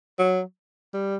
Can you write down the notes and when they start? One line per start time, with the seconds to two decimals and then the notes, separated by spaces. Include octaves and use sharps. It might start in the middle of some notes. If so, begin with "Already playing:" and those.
0.19 F#3
0.94 G3